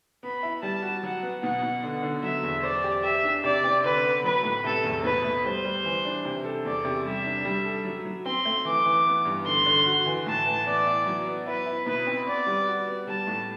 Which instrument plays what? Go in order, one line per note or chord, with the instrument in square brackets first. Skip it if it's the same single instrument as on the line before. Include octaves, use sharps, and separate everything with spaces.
[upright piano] B3 [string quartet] B5
[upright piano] E4
[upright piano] G3 [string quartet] A5
[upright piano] F#4
[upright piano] F#3 [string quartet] F#5
[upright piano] B3
[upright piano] B2 [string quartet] F#5
[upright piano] B2
D3
D3
[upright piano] F#3 [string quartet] E5
[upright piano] E2
[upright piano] C5 [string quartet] D5
[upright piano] G4
[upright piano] G4 [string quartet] E5
[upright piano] D4
[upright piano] C3 [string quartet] D5
[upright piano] C4
[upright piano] D3 [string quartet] B4
[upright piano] B3
[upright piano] F#3 [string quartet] B4
[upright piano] A2
[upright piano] C3 [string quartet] A4
[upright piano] E2
[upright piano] B2 [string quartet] B4
[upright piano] A3
[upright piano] G3 [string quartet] C5
[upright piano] G3
E3
D4
C3
A4
[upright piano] E2 [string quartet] D5
[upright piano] C3
[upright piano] G3 [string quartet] E5
[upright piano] D4
G3
A4
F#3
F#3
[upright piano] C4 [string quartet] C6
[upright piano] A3
[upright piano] E3 [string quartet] D6
[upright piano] E3
B3
G2
[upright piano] D3 [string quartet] C6
[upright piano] D3
F#4
E3
[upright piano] A2 [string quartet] A5
[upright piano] E3
[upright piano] B3 [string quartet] D5
[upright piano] E4
F#3
B3
[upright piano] E4 [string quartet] B4
[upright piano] E4
[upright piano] B2 [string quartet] B4
[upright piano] C4
[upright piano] B3 [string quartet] D5
[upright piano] G3
F#4
B3
[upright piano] G3 [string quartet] A5
[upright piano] A2